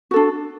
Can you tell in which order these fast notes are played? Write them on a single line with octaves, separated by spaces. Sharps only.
F#4 A4 D4